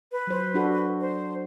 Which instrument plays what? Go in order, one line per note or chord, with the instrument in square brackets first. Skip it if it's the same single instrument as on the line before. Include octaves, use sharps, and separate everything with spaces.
[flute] B4
[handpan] F#3 C5
D4 F#4 A4
[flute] C5